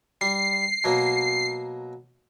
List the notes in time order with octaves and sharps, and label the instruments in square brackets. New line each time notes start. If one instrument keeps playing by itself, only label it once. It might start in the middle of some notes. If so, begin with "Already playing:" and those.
[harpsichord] G3 [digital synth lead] C7
[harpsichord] B2 F#3 A#3